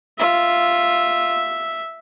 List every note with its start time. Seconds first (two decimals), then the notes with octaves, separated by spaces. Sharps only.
0.19 F4 E5